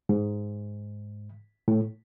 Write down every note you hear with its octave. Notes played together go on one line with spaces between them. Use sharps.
G#2
A2